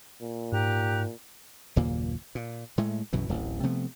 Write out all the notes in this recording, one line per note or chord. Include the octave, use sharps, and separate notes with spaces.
A#2
G#2 G4 A#5 F#6
F#1 D#2 A#2 A#3
A#2
A2 G#3 A3
B1 F#2 B2 E3
D1 A1
C3 F3 A3 B3